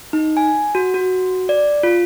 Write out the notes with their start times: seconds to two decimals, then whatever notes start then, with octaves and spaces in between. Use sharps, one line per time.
0.13 D#4
0.37 G#5
0.75 F#4
0.94 F#4
1.49 D5
1.83 F4